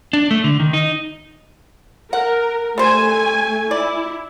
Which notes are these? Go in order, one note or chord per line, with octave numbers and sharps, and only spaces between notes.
D4
A3
D3
D#3
D#4
A#4 F#5
G3 A3 C5 G#5
E4 D5